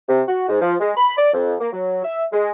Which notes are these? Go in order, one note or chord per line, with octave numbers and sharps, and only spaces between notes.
C3
F#4
G#2
F3
G#3
B5
D5
F2
A#3
F#3
E5
G#3